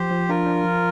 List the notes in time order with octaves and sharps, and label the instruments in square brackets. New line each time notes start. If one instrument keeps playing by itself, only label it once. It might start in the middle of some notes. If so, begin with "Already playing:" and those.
Already playing: [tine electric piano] F3 [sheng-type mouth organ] G4 C5
[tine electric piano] F3
[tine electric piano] D4 [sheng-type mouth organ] F4 A#4
[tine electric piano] D4
F3